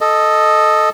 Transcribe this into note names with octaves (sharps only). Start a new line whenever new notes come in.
A4 D#5